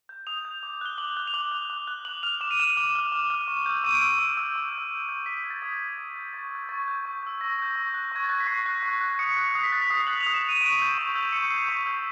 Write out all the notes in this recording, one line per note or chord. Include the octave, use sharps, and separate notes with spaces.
G6
D#6 F7
G6
D6
F#6 G7
D6 F#7
F#6
F7
D6 F#7
F#6
D6
F#6
D6 F#7
F6 F7
D6 E7
D#7
F6 E7
D6
F6
D6
F6
C#6
E6 G6
C#6 D#7
D7
E6 G6 D#7
C#6
E6 G6
C#6
G6
E6
D#6
G6
D#6 B6
G6 G#6
A6
D#6 G#6
G6
D#6
G6
C#6 A6
E6 G6
G#6
C#6 A6
E6 G6
C#6
E6 G6
C#6 A#6
E6 G6
C#6
F#6
C#6 G#6
A6
F#6 A#6
B6
C#6 C7
F#6
C#6
F#6
D#6 C#7
F#6
D#6 C7
B6
F#6 A6
B6
D#6 C7
F#6 F#7
F7
D#6
E7
F#6 D#7
C#6 D7
E6 G6
C#6
E6 G6
C#6 C#7
E6 G6 C7
C#6 B6
E6 G6